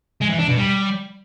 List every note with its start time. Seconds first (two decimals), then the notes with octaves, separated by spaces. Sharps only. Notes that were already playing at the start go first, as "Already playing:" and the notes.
0.21 G#3
0.30 E3
0.39 D4
0.48 B2
0.57 G3